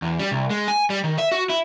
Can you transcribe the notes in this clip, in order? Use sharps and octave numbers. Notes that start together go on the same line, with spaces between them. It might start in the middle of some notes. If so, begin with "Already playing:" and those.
E2
G3
C2
G#3
G#5
G3
D#3
E5
F#4
E4